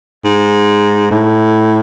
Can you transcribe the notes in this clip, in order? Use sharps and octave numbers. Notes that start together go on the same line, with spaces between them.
G#2
A2